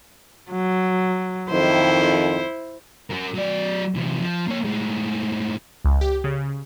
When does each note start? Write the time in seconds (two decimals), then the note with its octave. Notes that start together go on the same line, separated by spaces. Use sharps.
0.51 F#3
1.50 F2 D#3 E4 C5
3.10 F#4 A#4
3.34 F#3 D5
3.94 E2 C3
4.21 F3
4.48 A#3 C#5
4.65 A2 G#3
5.85 C#2
6.01 G4
6.24 C#3